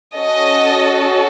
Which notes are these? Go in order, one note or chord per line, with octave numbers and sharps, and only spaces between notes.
C#4 F#4 A4 D#5